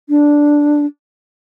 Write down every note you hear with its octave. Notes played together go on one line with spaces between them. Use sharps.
D4